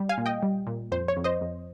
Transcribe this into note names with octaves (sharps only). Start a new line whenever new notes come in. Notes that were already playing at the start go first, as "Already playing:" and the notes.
Already playing: G3
F5 G#5
A#2
D#5 G5
G3
A#2
F2 C5
C#5
F2
C5 D#5
F2